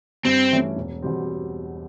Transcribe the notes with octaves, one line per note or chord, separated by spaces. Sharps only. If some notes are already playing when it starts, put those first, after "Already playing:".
G2 C4
E3 A3 C#4
E1
E2 B2 G3 C4